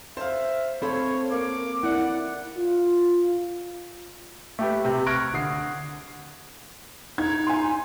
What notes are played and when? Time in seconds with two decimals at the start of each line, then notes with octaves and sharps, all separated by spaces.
0.17 C5 E5 F5
0.82 C4 A4 C5 C#5 F5 B5
1.32 A#3 D6
1.83 E4 D5 F#5
2.57 F4
4.59 A3 G4 B4
4.85 C3 G6
5.06 C#6 F6 F#6 G#6 A#6 D7
5.34 D3 D#6 C7
7.18 D#4 G#6
7.47 G#5 C6